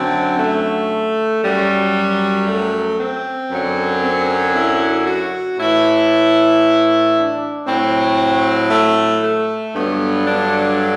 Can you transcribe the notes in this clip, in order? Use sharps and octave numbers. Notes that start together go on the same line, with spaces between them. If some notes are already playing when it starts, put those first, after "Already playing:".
Already playing: F#2 D3 F#3 C4
A3
F#2 F#3 G3
A3
C4
F#2 D3 F#3
C4
E4
F#4
A2 E3 E4
D4
A2 F#3 C4
A3
A3
G2 D3 F#3 B3
D4